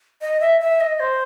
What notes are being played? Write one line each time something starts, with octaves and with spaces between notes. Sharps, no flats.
D#5
E5
E5
D#5
C5